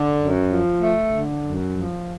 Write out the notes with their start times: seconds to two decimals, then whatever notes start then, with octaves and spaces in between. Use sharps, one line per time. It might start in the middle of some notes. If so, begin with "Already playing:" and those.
Already playing: D3
0.20 F#2
0.51 F3
0.81 A3
1.13 D3
1.44 F#2
1.74 F3